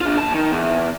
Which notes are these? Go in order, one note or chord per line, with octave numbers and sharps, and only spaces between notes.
D4 F4
D#2 A5
D#3
E2